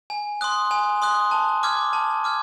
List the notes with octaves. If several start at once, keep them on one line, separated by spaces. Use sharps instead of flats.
G#5
C6 D#6 F#6
G#5
C6 D#6 F#6
A5
D6 F6 G#6
A5
D6 F6 G#6